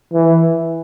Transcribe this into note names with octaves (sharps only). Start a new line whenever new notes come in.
E3